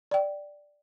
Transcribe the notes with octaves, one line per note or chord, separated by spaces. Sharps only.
D5 G5